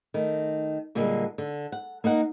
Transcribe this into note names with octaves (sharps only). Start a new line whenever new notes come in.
D#3 A3
A#2 D3 G3 G#3 A#3
D3
F#5
A#3 D#4 A#4 F#5